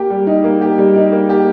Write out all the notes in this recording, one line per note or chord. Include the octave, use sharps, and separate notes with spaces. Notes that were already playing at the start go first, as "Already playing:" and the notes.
Already playing: A#3 G4
G3
D#4
A#3
G4
G3
D#4
A#3
G4